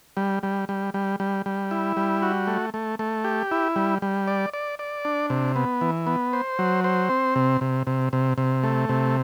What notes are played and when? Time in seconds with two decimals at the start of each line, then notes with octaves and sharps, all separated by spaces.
0.17 G3
0.43 G3
0.69 G3
0.94 G3
1.20 G3
1.46 G3
1.71 E4
1.97 G3
2.22 F#4
2.47 A3
2.74 A3
2.99 A3
3.24 G4
3.51 E4
3.76 G3
4.02 G3
4.27 D5
4.54 D5
4.79 D5
5.05 D4
5.30 C3
5.56 B3
5.81 E3
6.07 B3
6.33 C5
6.59 F#3
6.84 C5
7.10 C4
7.36 C3
7.61 C3
7.87 C3
8.13 C3
8.38 C3
8.63 A3
8.89 C3